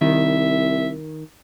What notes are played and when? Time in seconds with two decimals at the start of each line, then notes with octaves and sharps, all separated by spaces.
0.01 C2 D#3 E5